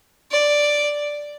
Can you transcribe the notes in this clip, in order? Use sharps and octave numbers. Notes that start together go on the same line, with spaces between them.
D5